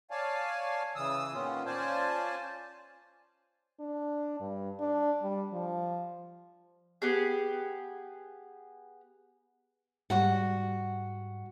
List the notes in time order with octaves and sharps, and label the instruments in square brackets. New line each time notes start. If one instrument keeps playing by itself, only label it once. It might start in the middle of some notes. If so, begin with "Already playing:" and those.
[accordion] C#5 D5 F5 G#5 A5
C#3 E3 D#6 E6
A#2 D#3 B3 C#4 F4
C#4 F4 C5 D5 G#5 A5
[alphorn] D4
G2
D4
G3
F3
[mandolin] B3 G4 G#4
[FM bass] G#2 [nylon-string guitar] G3 F#4 F#5